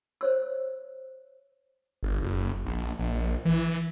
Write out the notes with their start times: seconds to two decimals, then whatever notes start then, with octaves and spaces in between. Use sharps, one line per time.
0.21 C5 C#5 E6
2.03 G1
2.22 F#1
2.65 A#1
2.99 A#1
3.45 E3